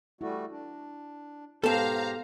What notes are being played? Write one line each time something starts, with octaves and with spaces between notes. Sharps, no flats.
G3 A3 E4 F#4
D4
G#2 B3 G4 A4 C5 F5 A5 A#5